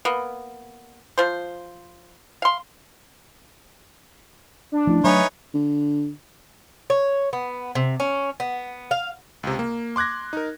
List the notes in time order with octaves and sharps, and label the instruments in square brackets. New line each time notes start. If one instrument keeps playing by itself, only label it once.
[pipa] A#3 B3
F3 C5
F5 C6
[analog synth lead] D4
[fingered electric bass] F3 C#4 [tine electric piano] A3 E4
[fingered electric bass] F#3 A3 [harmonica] D#4 B4 C#5 [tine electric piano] E5 G#5 C#6
[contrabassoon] D3
[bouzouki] C#5
B3
C3
C#4
B3
F5
[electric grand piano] C#2 C3
A#3
C6 D6 F#6 G#6 A#6
D#4 A#4